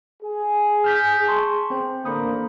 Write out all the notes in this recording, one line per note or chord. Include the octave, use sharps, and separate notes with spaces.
G#4
F6 G6 B6
A5 C6 C#6
C4 C5
A1 D3 A#3 C5 B5 D#6